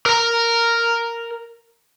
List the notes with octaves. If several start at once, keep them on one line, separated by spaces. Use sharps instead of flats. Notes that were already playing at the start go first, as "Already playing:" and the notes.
A#4 A#5